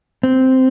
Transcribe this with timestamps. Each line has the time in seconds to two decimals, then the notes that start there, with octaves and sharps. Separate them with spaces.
0.23 C4